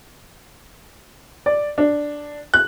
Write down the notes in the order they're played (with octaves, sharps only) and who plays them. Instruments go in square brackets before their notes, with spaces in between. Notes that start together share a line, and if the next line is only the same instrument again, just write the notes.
[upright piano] D5
D4
F#6